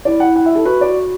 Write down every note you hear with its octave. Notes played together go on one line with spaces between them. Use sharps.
E4 D5
F#5
F#5
E5
A4
F#4 B4
D5